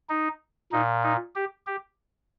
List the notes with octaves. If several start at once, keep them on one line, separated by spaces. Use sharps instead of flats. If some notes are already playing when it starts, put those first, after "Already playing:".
D#4
A#2 D#4
D#4
G4
G4